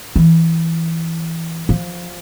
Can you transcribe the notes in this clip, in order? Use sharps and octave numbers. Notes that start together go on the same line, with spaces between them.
E3
F3